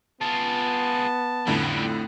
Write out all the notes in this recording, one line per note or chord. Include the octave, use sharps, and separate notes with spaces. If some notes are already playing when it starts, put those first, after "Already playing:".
B3 F4 G#4 A5
F2 A2 D3 G3 C#4